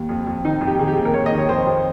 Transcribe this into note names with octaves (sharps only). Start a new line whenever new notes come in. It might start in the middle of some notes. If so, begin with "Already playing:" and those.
Already playing: D#2
F2
F2
D#3 D#4
F2
G4
D#3 G#4
G4
D#2 G#4
A#4
D#2 C#5
D#5
D#3
C#5
F2 C5
F2